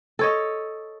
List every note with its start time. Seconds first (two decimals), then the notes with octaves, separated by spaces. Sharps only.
0.19 A4 C#5 D#5